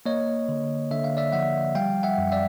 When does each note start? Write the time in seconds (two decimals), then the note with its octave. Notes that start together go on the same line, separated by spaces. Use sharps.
0.06 A#3 C#5 D#5
0.49 D3
0.91 D3 E5
1.04 F5
1.17 D5 E5
1.33 F3 E5 F#5
1.75 G3 F5 G5
2.03 E5 F#5
2.18 F#2
2.32 D5 E5